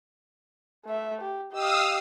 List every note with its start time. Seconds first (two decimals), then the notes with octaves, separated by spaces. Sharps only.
0.85 A3 E5
1.21 G4
1.52 G4 D#5 F5 D#6 E6